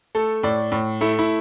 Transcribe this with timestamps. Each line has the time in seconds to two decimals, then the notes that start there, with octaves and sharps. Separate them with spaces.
0.15 A3 A4
0.43 A2 D5
0.72 A2
1.01 A3 E4
1.19 E4